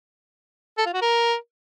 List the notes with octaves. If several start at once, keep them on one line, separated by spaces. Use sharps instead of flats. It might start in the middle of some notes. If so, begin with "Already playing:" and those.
A4
F4
F#4
A#4